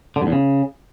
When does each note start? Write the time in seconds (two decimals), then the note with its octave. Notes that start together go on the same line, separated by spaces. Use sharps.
0.16 D3
0.22 G2
0.27 E2
0.32 C#3